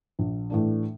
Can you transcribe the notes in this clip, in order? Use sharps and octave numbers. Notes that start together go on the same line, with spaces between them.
A#1
A2 E3 A3 D4